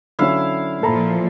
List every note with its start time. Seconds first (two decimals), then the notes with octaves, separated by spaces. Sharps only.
0.19 D3 F#3 C#4 E4 F5
0.83 A#2 F3 A4 A#5 B5